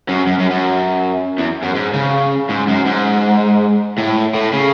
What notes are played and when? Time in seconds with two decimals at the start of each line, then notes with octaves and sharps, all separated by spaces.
0.09 F#2
0.27 F#2
0.39 F#2
0.51 F#2
1.38 E2
1.63 F#2
1.75 G#2
1.94 C#3
2.49 G#2
2.68 F#2
2.86 G#2
3.98 A2
4.35 A2
4.53 C#3